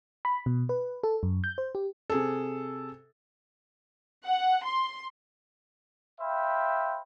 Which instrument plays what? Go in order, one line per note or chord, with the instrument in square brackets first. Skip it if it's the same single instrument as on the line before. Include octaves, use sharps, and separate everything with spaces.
[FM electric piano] B5
B2
B4
A4
F#2
G6
C5
G4
[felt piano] C3 G#4 A4
[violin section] F#5
C6
[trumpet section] C5 E5 F5 G5 B5